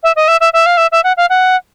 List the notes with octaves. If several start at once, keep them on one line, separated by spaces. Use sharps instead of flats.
E5
D#5
E5
E5
E5
F5
E5
E5
F#5
F5
F#5